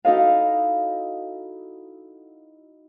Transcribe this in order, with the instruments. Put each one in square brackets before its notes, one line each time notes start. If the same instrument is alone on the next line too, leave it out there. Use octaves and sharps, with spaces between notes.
[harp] D#4 E4 F#4 A4 D#5 F5